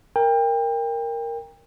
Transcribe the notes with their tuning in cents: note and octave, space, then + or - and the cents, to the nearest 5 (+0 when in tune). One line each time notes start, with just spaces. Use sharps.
A#4 +0 G5 +30